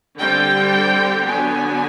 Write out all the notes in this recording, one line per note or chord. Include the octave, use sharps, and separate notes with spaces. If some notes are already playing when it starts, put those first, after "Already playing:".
D3 G3 C4 G5
D3 F#3 B3 D4 G#5